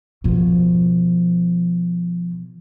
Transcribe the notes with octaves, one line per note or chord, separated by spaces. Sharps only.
B2 F3